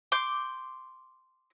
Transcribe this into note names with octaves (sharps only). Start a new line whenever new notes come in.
C6 D6 G6